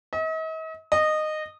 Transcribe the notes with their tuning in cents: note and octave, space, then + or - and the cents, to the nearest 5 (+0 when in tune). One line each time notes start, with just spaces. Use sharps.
D#5 +45
D#5 -15